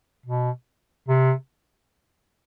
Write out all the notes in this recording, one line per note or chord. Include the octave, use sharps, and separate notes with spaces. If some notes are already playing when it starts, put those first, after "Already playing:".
B2
C3